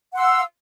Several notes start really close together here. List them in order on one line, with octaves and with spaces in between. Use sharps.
F#5 C6 E6 F5